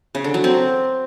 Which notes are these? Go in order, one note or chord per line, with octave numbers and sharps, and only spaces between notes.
C#3
D3
F#3
C4